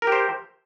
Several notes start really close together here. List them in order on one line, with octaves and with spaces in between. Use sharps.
A#4 G4 C5